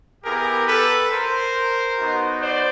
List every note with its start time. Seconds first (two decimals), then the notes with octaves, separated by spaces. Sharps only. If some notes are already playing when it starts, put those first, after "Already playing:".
0.24 B3 E4 G4 G#4 A#4
0.67 A4 B4
1.11 A#4 C5
1.98 B3 D#4 F#4
2.41 C5 D5